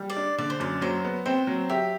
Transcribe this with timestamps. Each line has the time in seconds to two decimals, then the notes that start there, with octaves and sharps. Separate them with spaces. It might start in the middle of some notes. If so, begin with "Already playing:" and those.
Already playing: G3
0.10 D5
0.16 D4
0.38 D3 D5
0.50 C5
0.60 F#2 D5
0.82 F#3 C5
1.05 B3
1.26 C4 C5
1.47 F#3
1.69 G4 E5